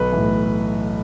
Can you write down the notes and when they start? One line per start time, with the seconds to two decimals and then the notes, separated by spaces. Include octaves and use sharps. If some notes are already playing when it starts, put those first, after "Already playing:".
Already playing: B1 B4
0.12 A2 E3